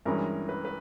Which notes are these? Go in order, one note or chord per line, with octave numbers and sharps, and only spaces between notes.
G2 E3 G#3 C#4 A#4
B4
B4